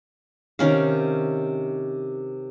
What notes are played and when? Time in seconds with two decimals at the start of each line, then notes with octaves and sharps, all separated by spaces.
0.59 C3 D#3 C#4 F5